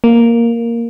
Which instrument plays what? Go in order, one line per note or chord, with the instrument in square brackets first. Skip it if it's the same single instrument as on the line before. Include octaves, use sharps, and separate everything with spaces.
[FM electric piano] A#3